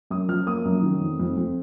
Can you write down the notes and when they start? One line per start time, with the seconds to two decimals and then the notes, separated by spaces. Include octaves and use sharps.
0.10 F#2 D#6
0.29 F3 F6
0.47 A#3 D#6
0.65 F#2
0.83 D#3
1.01 F2
1.20 F2
1.37 F2